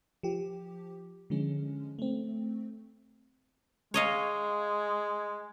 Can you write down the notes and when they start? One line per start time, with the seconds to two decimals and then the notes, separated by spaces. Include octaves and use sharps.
0.23 F3 G4
1.30 D3 F3 G#3 C#4
1.99 A3 C4
3.94 G#3 C#5 D#5 F5